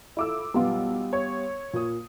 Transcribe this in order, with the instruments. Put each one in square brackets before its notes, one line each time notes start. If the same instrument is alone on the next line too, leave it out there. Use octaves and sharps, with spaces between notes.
[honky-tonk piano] E4 D6 E6 [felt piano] F4 A4
[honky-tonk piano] B1 [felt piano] G3 B3 F4
[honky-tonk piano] C#5
[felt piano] A#2 D#6